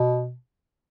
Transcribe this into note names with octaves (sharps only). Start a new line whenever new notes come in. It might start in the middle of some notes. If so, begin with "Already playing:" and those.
Already playing: B2